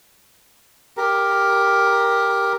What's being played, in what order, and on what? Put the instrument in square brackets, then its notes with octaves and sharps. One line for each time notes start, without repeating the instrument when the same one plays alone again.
[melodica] G4 A#4